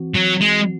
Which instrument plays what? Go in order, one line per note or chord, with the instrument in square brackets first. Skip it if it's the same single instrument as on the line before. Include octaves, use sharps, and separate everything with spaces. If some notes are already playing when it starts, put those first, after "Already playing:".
Already playing: [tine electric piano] E3 C4 F#4
[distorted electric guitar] F#3
G#3